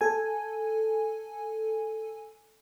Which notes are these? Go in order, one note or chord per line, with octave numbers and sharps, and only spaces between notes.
A4 G#5